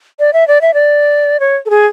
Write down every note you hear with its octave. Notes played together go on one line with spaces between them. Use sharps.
D5
E5
D5
E5
D5
C#5
A4
G#4